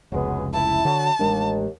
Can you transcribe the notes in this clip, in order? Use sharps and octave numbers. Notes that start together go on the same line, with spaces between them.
F1 C#2 F#3 G#3 B3
E4 A5
D3 F#3
A1 D#2 G#3 D4